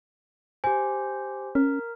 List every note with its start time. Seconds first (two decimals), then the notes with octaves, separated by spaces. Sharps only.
0.64 G4 C5 G#5
1.55 C#4 A#4